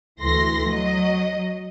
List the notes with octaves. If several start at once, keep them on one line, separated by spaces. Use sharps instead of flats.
D2 E3 A3 C6 A#6
F#3 D#5